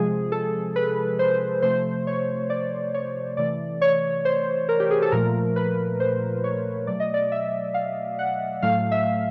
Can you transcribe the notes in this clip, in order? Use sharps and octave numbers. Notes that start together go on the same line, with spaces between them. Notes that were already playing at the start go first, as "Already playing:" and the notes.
Already playing: C3 F3 G#3 G#4
A4
B4
C5
C3 F3 A3 C5
C#5
D5
C#5
C3 E3 A3 D5
C#5
C5
A#4
G4
G#4
A4
A#2 F3 A3 A#4
B4
C5
C#5
B2 F#3 A3 D5
D#5
D5
E5
F5
F#5
A2 F#3 A3 F5
E5